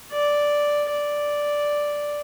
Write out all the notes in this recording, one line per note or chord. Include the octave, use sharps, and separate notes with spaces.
D5
D5